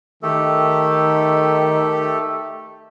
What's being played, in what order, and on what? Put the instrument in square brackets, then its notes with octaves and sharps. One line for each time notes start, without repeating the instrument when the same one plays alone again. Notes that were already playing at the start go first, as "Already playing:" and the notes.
[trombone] D#3 [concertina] A3 G4 A4